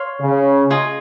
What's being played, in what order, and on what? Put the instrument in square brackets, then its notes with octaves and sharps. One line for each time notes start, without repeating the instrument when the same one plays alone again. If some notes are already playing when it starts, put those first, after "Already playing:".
Already playing: [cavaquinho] C#5 F5 C6
[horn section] C#3
[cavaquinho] F4 G#4 D#5